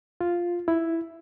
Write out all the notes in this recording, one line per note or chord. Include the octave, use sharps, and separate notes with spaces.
F4
E4